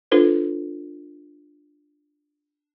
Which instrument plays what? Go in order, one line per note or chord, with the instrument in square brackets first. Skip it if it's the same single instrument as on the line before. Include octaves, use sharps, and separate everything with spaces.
[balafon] D4 F4 A4 B4 C5